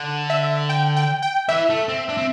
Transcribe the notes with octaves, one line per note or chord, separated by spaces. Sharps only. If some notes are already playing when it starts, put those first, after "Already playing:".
Already playing: D3
E5
G5
G5
G5
E3 E5
A3
C4
D4
C4